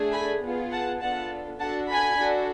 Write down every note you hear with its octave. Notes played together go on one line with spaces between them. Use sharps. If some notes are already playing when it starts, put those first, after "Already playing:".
Already playing: A3 D4 G#4
G#5 B5
B3 F4 G#4
F#5 A5
B3 D4 F4 A4 F#5 A5
D4 F#4 A4 F#5 A5
G#5 B5
D4 F#4 A4